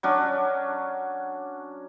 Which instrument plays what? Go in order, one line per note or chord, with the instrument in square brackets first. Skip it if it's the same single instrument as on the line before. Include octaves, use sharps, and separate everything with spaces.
[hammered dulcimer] F#3 C#4 D4